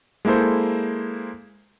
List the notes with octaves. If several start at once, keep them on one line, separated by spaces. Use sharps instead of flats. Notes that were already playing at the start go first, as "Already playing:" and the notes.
G#3 A#3 E4 A4 C5